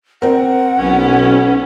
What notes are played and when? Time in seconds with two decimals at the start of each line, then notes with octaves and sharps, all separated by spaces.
0.22 C4 A#4 F#5
0.79 B1 B3 C#4 E4